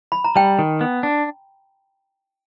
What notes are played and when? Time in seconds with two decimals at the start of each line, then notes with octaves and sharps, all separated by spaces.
0.12 B5
0.24 A#5
0.36 G3 G5 A5
0.59 D#3
0.81 B3
1.03 D4